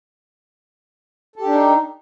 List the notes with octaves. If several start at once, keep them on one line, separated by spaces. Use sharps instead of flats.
D4 D#4 G4 A4